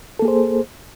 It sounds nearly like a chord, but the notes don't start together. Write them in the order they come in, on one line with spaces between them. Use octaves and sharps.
A4 A#3 G#4 C5